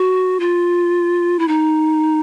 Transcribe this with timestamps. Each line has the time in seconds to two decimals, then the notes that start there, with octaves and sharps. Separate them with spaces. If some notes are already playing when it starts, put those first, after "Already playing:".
Already playing: F#4
0.40 F4
1.39 E4
1.48 D#4